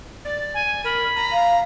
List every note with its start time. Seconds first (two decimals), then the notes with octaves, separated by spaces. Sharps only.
0.25 D5 A6
0.54 G#5
0.84 A#4 B5
1.16 A#5
1.32 F5